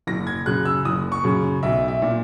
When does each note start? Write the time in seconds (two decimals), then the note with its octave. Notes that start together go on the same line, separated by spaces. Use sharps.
0.07 F#1 A#6
0.27 G#6
0.46 F#2 C#3 F#6
0.65 E6
0.85 F#1 D#6
1.12 C#6
1.24 F#2 C#3
1.63 B1 E5
1.88 E5
2.02 A#2